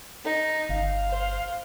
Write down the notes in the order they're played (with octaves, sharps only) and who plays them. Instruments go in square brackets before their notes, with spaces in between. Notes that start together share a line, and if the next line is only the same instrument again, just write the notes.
[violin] D#4
[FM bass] G1 [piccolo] F5
[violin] C5